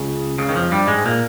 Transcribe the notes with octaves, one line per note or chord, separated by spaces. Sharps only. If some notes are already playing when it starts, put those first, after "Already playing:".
Already playing: C#2 C#3
C#2 C#3
D#3
F2 F3
G2 G3
G#2 G#3
A#2 A#3